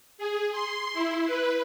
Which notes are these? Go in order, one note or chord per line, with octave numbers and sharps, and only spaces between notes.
G#4
C6
E4
B4